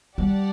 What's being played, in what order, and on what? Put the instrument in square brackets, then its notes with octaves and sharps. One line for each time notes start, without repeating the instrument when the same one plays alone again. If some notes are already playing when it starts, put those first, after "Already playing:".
[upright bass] G3 [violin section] G4 D5 F#5 A5